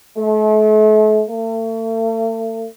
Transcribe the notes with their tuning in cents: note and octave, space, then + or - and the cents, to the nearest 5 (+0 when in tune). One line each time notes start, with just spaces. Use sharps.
A3 -40
A3 +40